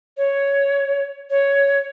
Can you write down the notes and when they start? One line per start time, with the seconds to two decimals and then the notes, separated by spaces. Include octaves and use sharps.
0.17 C#5
1.30 C#5